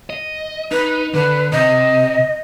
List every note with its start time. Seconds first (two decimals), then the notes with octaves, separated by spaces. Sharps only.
0.10 D#5
0.72 D#4 B4
1.14 D3 B4
1.53 C3 D#5